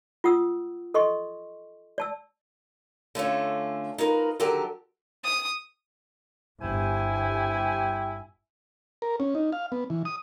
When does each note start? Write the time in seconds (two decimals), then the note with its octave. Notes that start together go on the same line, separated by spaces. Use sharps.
0.24 F4 F#5 D#6 E6
0.94 A4 D#5 C6 C#6
1.98 D5 A5 E6
3.15 D3 A3 C#4 F4
3.98 D#4 F4 A#4 B4
4.40 D3 D#3 F#3 G4 A4 A#4
5.24 D#6
6.61 G1 E4 G4 C5 G#5
9.02 A#4
9.20 C#4
9.35 D#4
9.52 F5
9.72 B3
9.90 E3
10.05 D#6